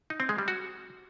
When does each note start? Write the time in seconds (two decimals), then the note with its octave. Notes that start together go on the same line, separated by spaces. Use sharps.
0.10 D#4
0.20 C4
0.29 G#3
0.38 G3
0.48 F#4